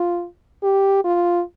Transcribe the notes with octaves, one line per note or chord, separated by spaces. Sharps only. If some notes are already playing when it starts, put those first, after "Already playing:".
Already playing: F4
G4
F4